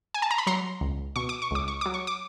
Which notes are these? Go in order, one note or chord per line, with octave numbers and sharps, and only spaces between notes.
G#5
A5
A#5
B5
F#3 A#5 C6
C#2
B2 C#6
D6
C#6
C#2 D6
C#6
F#3 D6
C#6
D6